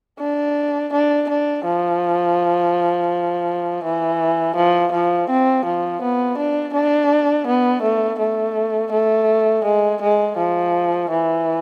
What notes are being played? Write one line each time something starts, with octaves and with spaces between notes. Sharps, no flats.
D4
D4
D4
F3
E3
F3
F3
C4
F3
B3
D4
D4
B3
A3
A3
A3
G#3
G#3
F3
E3